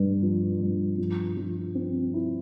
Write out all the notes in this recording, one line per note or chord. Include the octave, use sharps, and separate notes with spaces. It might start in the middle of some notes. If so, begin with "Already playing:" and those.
Already playing: G2
F3
G2
F3
F3
C4
E4